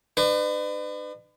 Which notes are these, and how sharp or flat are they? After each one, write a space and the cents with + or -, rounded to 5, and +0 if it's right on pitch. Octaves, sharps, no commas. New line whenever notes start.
D4 +45 B4 +35